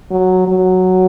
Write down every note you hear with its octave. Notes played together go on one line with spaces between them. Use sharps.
F#3
F#3